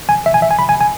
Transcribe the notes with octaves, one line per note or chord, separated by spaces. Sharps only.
G#5
E5
G#5
E5
G#5
B5
G#5
G#5